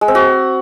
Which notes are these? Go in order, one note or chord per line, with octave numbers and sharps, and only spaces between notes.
G#3
C4
F#4